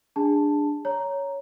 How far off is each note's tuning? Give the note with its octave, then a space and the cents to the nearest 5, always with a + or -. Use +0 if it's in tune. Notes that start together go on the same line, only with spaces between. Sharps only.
D4 +5 G#4 -20 A5 +0
C#5 +10 A#5 +0